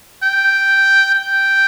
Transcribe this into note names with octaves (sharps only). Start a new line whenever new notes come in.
G5
G5